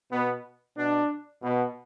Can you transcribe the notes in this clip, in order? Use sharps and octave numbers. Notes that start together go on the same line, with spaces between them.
B2 B3
B2 D4
B2